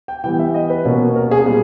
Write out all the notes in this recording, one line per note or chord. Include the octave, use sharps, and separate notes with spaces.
G5
E3 G3 B3 G5
E5
D#5
B4
B2 A#3 C#4
A#4
G#4
A#2 G3 G#4